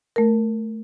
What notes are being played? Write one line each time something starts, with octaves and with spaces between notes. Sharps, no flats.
A3 A#4